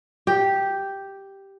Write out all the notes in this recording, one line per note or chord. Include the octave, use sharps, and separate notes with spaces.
G4